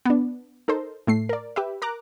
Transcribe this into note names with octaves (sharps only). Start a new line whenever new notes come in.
B3 D4
D#4 A4 A#4 C5
A2 A3 C7
A#4 D5
G4 B4 E5
A#4 A#5 D6 F#6